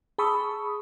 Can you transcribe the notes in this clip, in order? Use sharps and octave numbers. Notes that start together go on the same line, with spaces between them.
G#4 A5 B5 C#6 D#6 E6